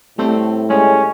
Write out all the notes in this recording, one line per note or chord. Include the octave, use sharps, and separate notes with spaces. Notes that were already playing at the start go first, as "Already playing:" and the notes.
A2 G3 A3 C4
G3 G#3 C#4 C#5